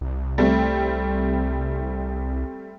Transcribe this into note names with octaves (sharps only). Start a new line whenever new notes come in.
C2
G3 A3 C4